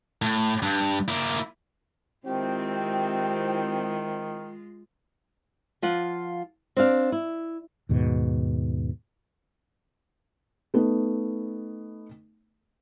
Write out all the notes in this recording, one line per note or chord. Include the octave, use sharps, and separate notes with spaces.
A2
G2
A#3 E4
D#3 G#3 C4 E4 F4 G4
F3 F4 F#5
C4 D4 F5
E4
D#2 G#2 B2
A3 B3 D#4